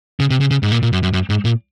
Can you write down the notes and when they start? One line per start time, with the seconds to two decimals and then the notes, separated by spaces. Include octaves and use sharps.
0.20 C#3
0.30 C3
0.40 C#3
0.51 C#3
0.63 G#2
0.72 A#2
0.83 A#2
0.93 F#2
1.03 F#2
1.13 F#2
1.30 G#2
1.45 A#2